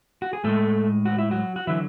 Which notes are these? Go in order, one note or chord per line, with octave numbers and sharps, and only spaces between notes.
F#4
G#4
A2 G#3 A3 A4
F#4
E4
F#3 F#4
F#4
D3 E3 F#3 E4